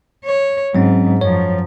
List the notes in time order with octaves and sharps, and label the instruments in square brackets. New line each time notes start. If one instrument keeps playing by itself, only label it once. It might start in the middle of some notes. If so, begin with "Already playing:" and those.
[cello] C#5
[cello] G#2 [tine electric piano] F#3 C4 C#4
[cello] F#2 F3 [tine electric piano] C#5